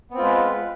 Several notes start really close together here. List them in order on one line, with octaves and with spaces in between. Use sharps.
B3 C4 F4 G#3 B4